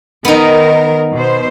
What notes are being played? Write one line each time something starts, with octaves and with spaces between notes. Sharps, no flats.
D#3 B3 D#4 A#4
B2 C5